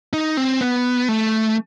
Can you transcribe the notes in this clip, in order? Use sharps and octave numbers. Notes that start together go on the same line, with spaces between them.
D#4
C4
B3
A3